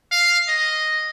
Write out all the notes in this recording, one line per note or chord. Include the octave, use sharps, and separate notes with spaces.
F5
D#5